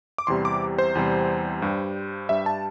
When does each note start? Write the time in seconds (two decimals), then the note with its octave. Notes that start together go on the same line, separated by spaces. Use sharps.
0.18 D6
0.27 E2 C3 G3 C6
0.45 D6
0.78 C5
0.95 E2 C3 G3
1.62 G2 G3
2.29 G2 G3 E5
2.46 A5